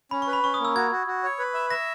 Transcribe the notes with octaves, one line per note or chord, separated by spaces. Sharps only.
C#4 B5
C#6
B4
B5
C#4 C#6
D#6
A#3 E6
F#4 G#6
F#4
F#4
C#5
B4
E5
E5 A#6